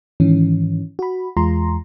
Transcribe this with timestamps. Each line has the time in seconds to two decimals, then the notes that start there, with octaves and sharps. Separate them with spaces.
0.20 G#2 D#3 E3 C#4
0.99 F#4 B5
1.37 E2 G#3 F4 A#5 C6